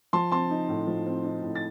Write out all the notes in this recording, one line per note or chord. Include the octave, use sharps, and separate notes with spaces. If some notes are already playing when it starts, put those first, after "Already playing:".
F3 A5 C6
C4 A5 C6
D#4
A2
F3
C4
D#4
A2
A6